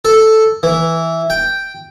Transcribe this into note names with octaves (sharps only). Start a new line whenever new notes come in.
A4
E3
G5